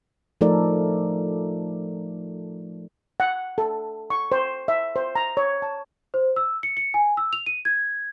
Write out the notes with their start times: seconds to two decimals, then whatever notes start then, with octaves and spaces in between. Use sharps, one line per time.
0.41 F3 A3 D#4 A4 A#4 D5
3.20 F#5
3.58 A4
4.10 C#6
4.32 C5
4.68 E5
4.96 C5
5.16 A#5
5.37 C#5
5.62 A5
6.14 C5
6.36 E6
6.63 C#7
6.77 C#7
6.94 G#5
7.17 E6
7.33 F7
7.46 D#7
7.65 G#6